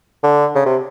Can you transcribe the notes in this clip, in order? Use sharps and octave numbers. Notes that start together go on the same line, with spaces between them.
D3
C#3
C3